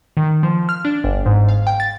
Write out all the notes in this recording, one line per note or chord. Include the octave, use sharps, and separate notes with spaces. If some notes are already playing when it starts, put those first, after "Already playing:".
D#3
F3
F6
D4
G1
G#2
F5
G5
A6